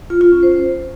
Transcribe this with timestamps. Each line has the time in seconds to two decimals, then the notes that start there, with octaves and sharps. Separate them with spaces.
0.10 F4
0.21 F4
0.32 C#4
0.43 C5